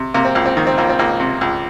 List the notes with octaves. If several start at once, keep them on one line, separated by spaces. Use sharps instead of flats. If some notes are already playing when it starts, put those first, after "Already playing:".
Already playing: C3
C3 A#3
C4
C#2 A#3
C4
D#3 A#3
C4
C#2 A#3
C4
C#2 A#3
C3
C#2